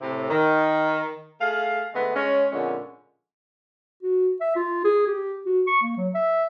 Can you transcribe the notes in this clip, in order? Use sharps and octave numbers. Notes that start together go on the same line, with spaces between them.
A2 C3
D#3
A3 G#4 F5
D3 G#3 A3 B3
G#3 C#4
F2 A#2 D3 G#3 C#4
F#4
E5
F4
G#4
G4
F#4
C#6
A#3
F#3
E5